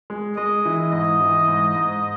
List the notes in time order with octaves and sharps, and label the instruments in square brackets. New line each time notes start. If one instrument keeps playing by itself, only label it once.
[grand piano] G#3
[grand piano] G#3 [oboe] D#5
[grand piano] E3
[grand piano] G#2 [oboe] D#5
[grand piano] E3
G#2
G#2